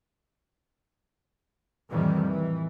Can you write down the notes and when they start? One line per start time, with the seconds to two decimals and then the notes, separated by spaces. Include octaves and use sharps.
1.91 F2 A2 C3 D#3 E3 G3
2.26 E3